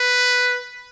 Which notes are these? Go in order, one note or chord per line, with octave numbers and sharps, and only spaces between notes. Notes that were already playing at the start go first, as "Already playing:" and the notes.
Already playing: B4